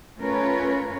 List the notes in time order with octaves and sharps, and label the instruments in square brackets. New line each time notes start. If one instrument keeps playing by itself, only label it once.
[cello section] A3 C#4 F4 A#4 B4 C#5